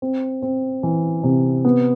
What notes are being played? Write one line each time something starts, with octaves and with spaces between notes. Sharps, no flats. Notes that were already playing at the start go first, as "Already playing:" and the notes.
C4
C4
E3
C3
B3